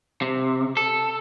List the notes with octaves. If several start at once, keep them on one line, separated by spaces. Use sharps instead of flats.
C3
A4